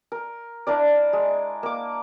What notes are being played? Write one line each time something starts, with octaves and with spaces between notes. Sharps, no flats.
A#4
D4 E4 A#4 D5
G#3
A#3 D6